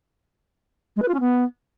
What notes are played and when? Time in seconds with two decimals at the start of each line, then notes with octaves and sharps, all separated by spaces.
0.96 G#3
1.02 B4
1.08 F4
1.14 C#4
1.20 B3